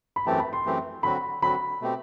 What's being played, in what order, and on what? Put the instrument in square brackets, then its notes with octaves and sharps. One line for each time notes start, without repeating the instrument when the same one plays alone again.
[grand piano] B5
[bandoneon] F#2 E3 A3 C4 G4 [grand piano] A5
[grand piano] B5
C6
[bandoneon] F#2 E3 A3 C4 G4
[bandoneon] D3 F#3 C4 F#4 [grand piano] B5
[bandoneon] D3 F#3 C4 F#4 [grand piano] B5
[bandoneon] B2 A3 C4 G4